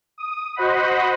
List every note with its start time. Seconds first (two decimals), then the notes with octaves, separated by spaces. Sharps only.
0.18 D#6
0.56 F#4 C5 D#5 F#5 B5